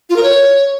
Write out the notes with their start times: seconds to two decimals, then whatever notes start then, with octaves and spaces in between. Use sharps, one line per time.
0.10 F4
0.16 A#4
0.23 C#5